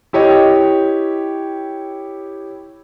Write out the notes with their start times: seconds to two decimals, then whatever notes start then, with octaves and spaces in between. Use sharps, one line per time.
0.13 E4 G4 C#5 D#5